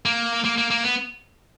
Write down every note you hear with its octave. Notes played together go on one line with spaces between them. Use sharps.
A#3
A#3
A#3
A#3
B3